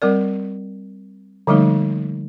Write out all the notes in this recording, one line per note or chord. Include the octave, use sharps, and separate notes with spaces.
G3 C4 A#4 D5
D3 F3 G3 A3 A#3 D#4